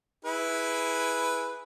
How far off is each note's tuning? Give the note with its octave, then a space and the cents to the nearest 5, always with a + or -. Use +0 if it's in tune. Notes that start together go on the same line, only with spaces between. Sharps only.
E4 -5 G#4 +0 B4 +0